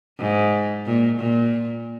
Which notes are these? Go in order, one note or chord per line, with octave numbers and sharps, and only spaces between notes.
G#2
A#2
A#2